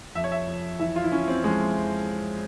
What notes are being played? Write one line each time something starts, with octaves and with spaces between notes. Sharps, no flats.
F2 E5
C#5
E5
F2
E3 E5
F4
E4
E3 C#4
C4
F2 G#3
F2